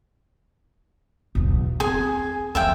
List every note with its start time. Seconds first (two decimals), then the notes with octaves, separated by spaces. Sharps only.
1.35 B1 E2
1.80 C4 G#4 G#5
2.55 D#2 F3 E5 F5 G5